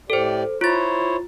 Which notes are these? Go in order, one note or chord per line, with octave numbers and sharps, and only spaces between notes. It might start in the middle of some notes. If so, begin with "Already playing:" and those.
A2 G4 A4 C5 D5
E4 F4 C5 C#5 A6